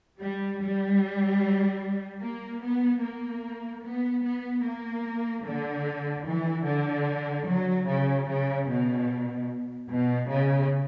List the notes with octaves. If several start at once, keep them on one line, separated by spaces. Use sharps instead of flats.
G3
G3
A#3
B3
A#3
B3
B3
A#3
D3
E3
D3
F#3
C#3
C#3
B2
B2
C#3